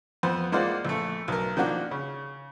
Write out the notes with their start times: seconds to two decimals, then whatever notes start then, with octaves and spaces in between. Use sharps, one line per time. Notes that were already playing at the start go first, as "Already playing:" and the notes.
0.23 F2 B3 C5
0.52 G#3 A#3 F4 C5 D5 F#5
0.85 A#1 A3
1.28 B1 A#4
1.56 D#3 F3 A#3 D4 F#4
1.91 C#3